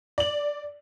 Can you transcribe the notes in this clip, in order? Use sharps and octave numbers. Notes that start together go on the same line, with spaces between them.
D5 F#7